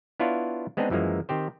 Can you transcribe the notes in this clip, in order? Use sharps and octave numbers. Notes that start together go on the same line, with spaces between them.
B3 D4 E4 F4 C#5 F5
G#3 B3 C4 D4 D#4 G#4
F#2 E3 F3 G#3 A#3
D#3 C4 G4 C5